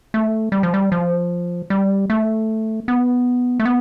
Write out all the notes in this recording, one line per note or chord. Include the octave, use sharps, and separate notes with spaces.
A3
G3
F3
G3
F3
G3
A3
B3
A3
B3